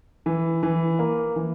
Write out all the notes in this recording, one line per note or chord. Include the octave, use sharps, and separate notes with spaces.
E3
E3
A#3
E3